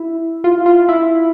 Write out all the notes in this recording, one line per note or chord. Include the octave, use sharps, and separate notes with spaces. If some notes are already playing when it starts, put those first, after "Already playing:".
Already playing: E4
F4
F4
E4